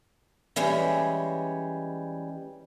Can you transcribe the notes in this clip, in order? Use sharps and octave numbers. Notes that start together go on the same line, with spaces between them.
E3 G3 G#3 C#4